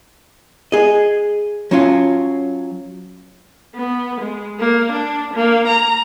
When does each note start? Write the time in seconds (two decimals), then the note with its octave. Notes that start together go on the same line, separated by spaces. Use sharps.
0.72 G#4 D#5
1.71 F#3 C#4 F4
3.75 B3
4.21 G#3
4.60 A#3
4.92 D4
5.34 A#3
5.68 A#5